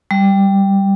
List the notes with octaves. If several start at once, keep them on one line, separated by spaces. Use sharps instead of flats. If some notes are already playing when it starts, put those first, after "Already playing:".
G3